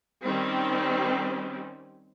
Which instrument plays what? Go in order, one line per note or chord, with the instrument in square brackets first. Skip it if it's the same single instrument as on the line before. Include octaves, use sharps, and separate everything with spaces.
[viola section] D#3 G3 C4 C#4